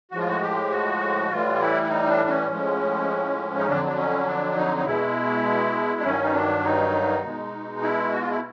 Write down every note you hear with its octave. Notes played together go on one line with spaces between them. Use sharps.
A2 F3 G#3 F#4
F4
F#4
G4
F#4
A2 E3 G3 F4
E4
E4
D#4
D4
C#4
A2 F3 G#3
D#4
F2 D3 F#3 D4
D4
C#4
D4
D#4
D#4
B2 G#3 E4
D4
G2 D#3 F#3 C#4
D#4
D4
D#4
B2 G#3
E4
F#4
F4
E4